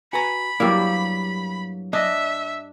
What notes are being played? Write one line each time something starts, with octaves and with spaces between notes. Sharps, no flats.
F#4 B4 G#5 A#5 B5
G2 F#3 A#3 E4 G4 D5
D4 D#5 E5